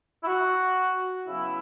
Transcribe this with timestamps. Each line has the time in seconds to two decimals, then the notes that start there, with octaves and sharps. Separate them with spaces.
0.23 E4
0.26 F#4
1.27 C#3 F#3 B3 E4